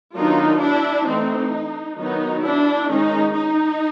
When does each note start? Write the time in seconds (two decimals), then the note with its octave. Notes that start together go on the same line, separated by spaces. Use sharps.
0.16 D#3 F#3 B3 D4 D#4 F4
0.61 D4 E4
1.07 E3 A3 C4 D#4
1.98 D#3 F#3 B3 D#4
2.43 D4 E4
2.89 D#3 G#3 C#4 D#4
3.34 D#4